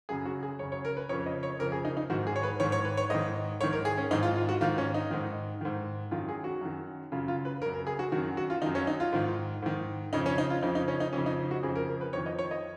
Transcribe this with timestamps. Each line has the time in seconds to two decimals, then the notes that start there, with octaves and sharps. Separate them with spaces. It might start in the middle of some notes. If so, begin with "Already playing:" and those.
0.09 F#2 C#3 G#4
0.26 F#4
0.43 G#4
0.59 F#2 C#5
0.63 C#3
0.72 C#5
0.85 A#4
0.97 B4
1.09 F2 C#3 C#5
1.26 D#5
1.43 C#5
1.59 F2 C#3 A#4
1.72 G#4
1.85 D#4
1.97 D#4
2.10 G#2 D#3 F#4
2.27 G#4
2.36 C#5
2.43 B4
2.60 G#2 D#3 C#5
2.72 C#5
2.85 B4
2.97 C#5
3.10 G#2 D#3 D#5
3.60 G#2 C#5
3.63 D#3
3.73 A#4
3.85 G#4
3.98 C#4
4.11 G#2 D#3 D#4
4.23 F4
4.36 F4
4.49 F#4
4.61 G#2 D#3 F4
4.78 C#4
4.94 D#4
5.11 G#2 D#3
5.61 G#2 D#3
6.11 F#2 D#3 F4
6.29 G#4
6.44 F#4
6.61 F#2 D#3
7.12 F#2 C#3 F4
7.28 F4
7.45 B4
7.62 C#3 A#4
7.66 F#2
7.74 A#4
7.87 G#4
7.99 F#4
8.12 F#2 D#3 F#4
8.37 F#4
8.50 F4
8.62 F#2 D#3 D#4
8.75 C#4
8.87 D#4
9.00 F4
9.12 G#2 D#3
9.62 G#2 D#3
10.13 F2 C#3 D#4
10.26 C#4
10.38 D#4
10.50 F4
10.62 F2 C#3 D#4
10.75 D#4
10.88 C#4
11.00 D#4
11.13 F2 C#3 C#4
11.26 D#4
11.51 F#4
11.63 F2 C#3 G#4
11.76 A#4
11.88 A#4
12.01 B4
12.13 F2 D#3 C#5
12.26 D#5
12.39 C#5
12.51 D#5